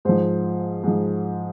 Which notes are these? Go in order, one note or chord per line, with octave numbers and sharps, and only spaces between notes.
G#2 F3 C5
G#2 F3